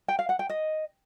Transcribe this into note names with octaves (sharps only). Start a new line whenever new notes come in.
G5
F5
F#5
G5
D#5